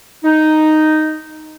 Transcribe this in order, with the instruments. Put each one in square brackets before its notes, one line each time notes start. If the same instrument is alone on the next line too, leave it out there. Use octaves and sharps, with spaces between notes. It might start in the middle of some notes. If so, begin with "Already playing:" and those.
[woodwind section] D#4